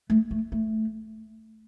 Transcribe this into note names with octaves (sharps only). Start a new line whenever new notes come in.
A3
A3
A3